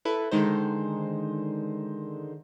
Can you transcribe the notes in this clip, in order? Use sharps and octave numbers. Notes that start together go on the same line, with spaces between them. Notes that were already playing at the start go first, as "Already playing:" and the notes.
E4 A4 B4
D3 D#3 G#3 D#4 C5